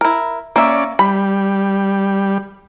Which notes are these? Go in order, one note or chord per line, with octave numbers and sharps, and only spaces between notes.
E4 A#4
A#3 C#4 D5 E5
G3 B5